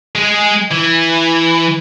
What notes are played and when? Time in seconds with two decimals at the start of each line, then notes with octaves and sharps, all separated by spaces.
0.16 G#3 G#4
0.72 E3